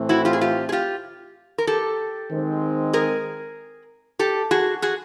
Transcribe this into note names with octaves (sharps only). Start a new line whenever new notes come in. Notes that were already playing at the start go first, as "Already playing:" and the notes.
Already playing: A2 E3 A3 C4
E4 F#4
F4 G4
G#4
F4 G4
G#4
F4 G4
A#4
G4 A4
D#3 G#3 C4
G#4 A#4
G4 A4
F#4 G#4
F#4 G#4